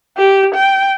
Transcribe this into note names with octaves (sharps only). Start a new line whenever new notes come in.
G4
G5